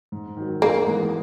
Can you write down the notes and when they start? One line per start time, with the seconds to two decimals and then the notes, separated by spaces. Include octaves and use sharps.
0.12 G#2
0.37 D#3 F#3
0.62 G#2 A#3
0.87 E3 G#3 B3 E4